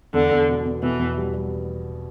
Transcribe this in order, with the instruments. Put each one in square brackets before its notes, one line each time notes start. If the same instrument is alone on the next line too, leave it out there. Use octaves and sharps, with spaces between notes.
[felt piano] E2 [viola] D3
[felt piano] E2
B2
B2
[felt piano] B2 [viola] E3
[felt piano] E2
G3
G3